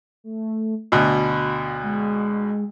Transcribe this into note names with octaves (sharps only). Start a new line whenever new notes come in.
A3
D2 B2 B5
G#3